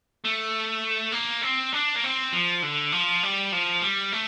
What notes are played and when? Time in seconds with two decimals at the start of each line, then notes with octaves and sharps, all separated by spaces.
0.24 A3
1.13 A#3
1.43 C4
1.73 D4
1.95 A#3
2.04 C4
2.32 F3
2.62 D3
2.92 F3
3.23 G3
3.52 F3
3.82 G3
4.12 A3